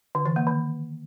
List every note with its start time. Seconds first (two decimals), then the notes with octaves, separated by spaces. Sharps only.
0.15 D3
0.26 E3
0.36 A#3
0.47 D#3